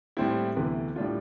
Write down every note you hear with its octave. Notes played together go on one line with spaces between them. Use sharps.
A2 G3 C4 E4
D2 C3 E3 B3
A2 G3 D4 F4